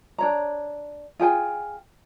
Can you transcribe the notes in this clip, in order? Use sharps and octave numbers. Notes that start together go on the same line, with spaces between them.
D4 C#5 A#5
F4 G#4 G5 G#5